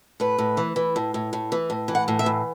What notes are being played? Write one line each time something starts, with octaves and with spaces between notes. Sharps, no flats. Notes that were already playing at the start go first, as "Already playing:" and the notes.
A2 B4
A2
E3
E3
A2
A2
A2
E3
A2
E3
F#5
A2
E5
E3